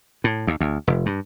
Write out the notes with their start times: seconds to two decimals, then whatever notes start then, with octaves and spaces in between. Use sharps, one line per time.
0.24 A2
0.47 D#2
0.60 D2
0.87 F1
1.06 G2